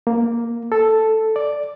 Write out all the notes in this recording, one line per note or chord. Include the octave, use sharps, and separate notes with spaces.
A#3
A4
D5